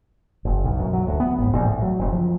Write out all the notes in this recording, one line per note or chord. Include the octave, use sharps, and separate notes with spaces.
F#1
B1
F#2
F#3
D2
B3
G#1
A#1
A2
F#3
F#1
F3